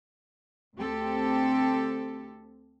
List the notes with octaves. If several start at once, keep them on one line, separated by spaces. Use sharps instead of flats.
D2 C4 G4 A4